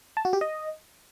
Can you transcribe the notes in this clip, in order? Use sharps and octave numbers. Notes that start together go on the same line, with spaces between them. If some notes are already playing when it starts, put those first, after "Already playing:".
A5
F#4
G4
D#5